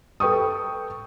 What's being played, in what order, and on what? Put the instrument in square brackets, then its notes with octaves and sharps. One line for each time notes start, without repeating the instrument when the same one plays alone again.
[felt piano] A4 B4 G5 C#6 D#6